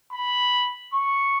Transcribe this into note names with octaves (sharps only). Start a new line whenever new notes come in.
B5
C#6